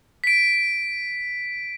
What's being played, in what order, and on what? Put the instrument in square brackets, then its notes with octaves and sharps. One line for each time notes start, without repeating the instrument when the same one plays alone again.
[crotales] B6 D7